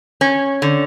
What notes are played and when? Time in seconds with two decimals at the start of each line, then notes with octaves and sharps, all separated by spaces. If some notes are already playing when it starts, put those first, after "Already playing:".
0.21 C#4
0.62 D3